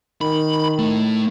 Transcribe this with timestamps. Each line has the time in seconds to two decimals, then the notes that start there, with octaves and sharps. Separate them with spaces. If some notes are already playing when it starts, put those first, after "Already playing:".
0.21 D#3 B5
0.79 A2 A3